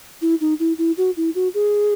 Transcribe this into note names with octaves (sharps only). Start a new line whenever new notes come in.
E4
D#4
E4
E4
F#4
E4
F#4
G#4